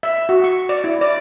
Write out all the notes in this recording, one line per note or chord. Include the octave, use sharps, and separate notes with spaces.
E5
F#4
C#6
D5
E4
D5